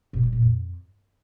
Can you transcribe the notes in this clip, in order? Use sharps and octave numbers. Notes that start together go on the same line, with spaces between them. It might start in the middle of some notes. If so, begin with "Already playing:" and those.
B2
G3
A#2
F2